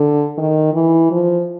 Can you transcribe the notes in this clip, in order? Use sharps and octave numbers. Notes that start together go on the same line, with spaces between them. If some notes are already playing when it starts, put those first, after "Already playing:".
Already playing: D3
D#3
E3
F3